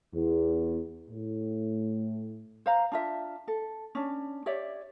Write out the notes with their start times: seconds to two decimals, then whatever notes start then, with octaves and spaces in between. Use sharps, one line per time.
0.14 E2
1.10 A2
2.66 C5 F5 A#5
2.92 D4 F4 E5
3.48 A4
3.95 C#4 D4
4.46 G4 C#5 D5 E5